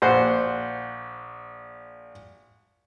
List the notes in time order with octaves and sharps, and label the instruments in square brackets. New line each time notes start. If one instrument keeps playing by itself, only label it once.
[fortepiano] A#1 C5 F#5